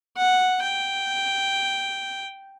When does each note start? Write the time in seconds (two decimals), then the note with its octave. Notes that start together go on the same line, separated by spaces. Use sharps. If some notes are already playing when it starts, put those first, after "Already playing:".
0.17 F#5
0.62 G5